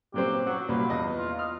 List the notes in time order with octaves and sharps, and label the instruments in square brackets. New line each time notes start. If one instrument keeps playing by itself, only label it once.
[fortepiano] A#2 F#3 C4 [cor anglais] G4
[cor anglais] F#3 [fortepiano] F#4
[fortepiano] C2 A#2 [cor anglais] B4
[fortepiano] E2 D#5
[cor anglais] F4
[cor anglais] D#5 [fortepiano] F6